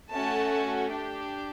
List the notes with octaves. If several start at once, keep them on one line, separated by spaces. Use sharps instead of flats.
A3 C#4 F#4 A4 A5
D4 G4